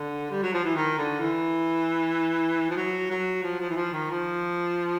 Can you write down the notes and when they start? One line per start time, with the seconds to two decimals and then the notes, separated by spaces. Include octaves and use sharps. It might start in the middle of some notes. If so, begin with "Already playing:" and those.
Already playing: D3
0.30 G3
0.42 F#3
0.53 F3
0.64 E3
0.76 D#3
0.98 D3
1.20 E3
2.70 F3
2.76 F#3
3.10 F#3
3.43 F3
3.59 F3
3.70 E3
3.76 F3
3.93 D#3
4.10 F3